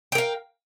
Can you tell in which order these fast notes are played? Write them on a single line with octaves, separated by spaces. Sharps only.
G5 A#4 F5